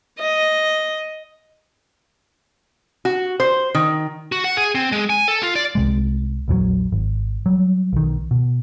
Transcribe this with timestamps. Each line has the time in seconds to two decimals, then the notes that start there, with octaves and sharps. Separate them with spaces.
0.19 D#5
3.05 F#4
3.40 C5
3.75 D#3
4.32 F#4
4.44 F#5
4.57 G#4
4.75 C4
4.92 G#3
5.10 G#5
5.28 A4
5.43 F4
5.55 D5
5.75 C2 C3 G#3
6.48 A#1 E2 E3 F#3
6.92 G#1
7.46 F#3 G3
7.93 B1 D#3
8.31 B2